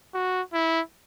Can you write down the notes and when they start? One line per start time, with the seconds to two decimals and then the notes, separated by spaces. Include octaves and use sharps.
0.14 F#4
0.53 E4